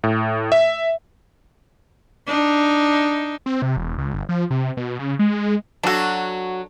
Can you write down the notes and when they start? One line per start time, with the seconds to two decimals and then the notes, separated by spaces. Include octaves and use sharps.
0.04 A2
0.52 E5
2.27 D4 D#4
3.46 C4
3.62 C3
3.77 E1
3.98 C#2
4.14 G1
4.29 F3
4.50 C3
4.77 B2
4.99 C#3
5.19 G#3
5.83 F#3 D4 F#4 A4